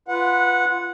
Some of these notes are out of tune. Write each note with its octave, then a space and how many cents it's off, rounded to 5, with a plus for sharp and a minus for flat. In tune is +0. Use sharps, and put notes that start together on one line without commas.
F4 -10 B4 +0 F#5 -15